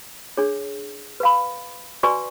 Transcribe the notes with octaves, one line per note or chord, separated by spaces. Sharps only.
D4 G#4 C#5
B4 F5 B5
F#4 B4 D5 G#5 C#6